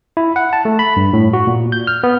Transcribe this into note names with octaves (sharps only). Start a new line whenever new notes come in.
E4
F#5
A5
A3
B5
G2
A2
F#4
A#2
G6
F6
B3